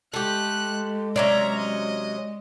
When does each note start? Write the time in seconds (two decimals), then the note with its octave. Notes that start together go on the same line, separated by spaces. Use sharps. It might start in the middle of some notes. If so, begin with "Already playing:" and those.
0.14 G#3 A3 G4 F#6
1.16 C3 F#3 C#4 D5 E5 A#5
1.58 D#5